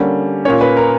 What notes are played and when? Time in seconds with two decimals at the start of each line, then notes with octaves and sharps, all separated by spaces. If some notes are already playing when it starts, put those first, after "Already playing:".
Already playing: D3 G3 A#3 C#4
0.45 A#2 A#3 C#4 C#5
0.61 B4
0.77 A#4